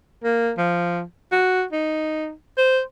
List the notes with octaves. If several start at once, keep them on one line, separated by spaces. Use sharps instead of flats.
A#3
F3
F#4
D#4
C5